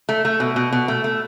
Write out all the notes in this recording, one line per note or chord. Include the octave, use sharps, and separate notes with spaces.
A3
A3
B2
B2
B2
A3
A3